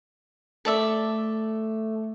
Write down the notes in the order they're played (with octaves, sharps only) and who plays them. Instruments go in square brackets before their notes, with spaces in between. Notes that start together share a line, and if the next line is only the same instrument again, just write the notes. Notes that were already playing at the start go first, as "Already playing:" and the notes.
[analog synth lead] A3 [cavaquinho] A4 D5 E5